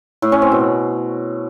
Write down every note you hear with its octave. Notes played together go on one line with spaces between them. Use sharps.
A2
C#4
C4
B2